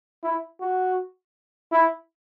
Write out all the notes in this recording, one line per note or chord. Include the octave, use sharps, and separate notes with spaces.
E4
F#4
E4